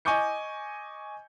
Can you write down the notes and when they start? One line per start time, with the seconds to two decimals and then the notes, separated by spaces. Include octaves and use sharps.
0.05 D#5 G#5 C#6 D6 G6 C#7